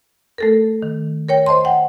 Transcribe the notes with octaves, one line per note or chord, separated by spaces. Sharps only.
A3 A4 A#4
D#3
A#4 C#5 G5
C5 D#5 A5 C6
F#5 G5